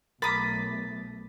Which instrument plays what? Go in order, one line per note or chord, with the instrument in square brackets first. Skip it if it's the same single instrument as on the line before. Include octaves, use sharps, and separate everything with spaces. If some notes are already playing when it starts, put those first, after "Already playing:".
[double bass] B1 A3 [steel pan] A#4 D#6 [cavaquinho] B5 D6 [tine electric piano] A6 B6